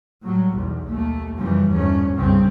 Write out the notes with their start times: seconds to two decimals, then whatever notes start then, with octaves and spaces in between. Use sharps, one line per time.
0.22 A2 F#3 G3
0.56 B1 E2
0.90 D#2 A3
1.38 F#2 C#3 E3 F3 G3
1.70 G1 E2 G#2 A3 C#4
2.15 C2 G2 A#2 C#3 G3 C4